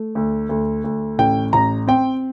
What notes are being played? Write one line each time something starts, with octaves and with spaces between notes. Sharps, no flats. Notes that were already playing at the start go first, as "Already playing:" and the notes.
Already playing: A3
D2
D2
D2
A1 G5
A1 A#5
C4 G5